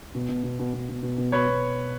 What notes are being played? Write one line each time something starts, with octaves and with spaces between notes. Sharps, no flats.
B2
B2
B2
B2
B2
B2
B2
B2
B2 B4 C#5
B2